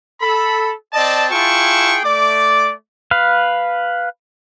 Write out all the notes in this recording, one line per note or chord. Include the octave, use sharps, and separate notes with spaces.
A4 B5
C4 D5 D#5 A5
E4 F4 G#4 G5 A5 C#6
A3 D5 D6
B4 F5